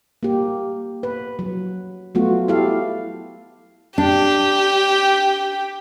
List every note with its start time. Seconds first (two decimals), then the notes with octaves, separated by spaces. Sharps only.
0.23 A#3 G4
1.03 B4
1.39 F#3
2.15 F#3 A3 B3 F4 F#4
2.48 E4 G4 A4 F5
3.98 D4 G4